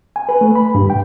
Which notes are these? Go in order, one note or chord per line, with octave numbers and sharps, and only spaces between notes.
G#5
B4
A3
B5
G2
G5